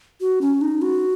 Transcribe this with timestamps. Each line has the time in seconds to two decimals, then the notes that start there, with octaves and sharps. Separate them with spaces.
0.21 F#4
0.41 C#4
0.62 D#4
0.82 F#4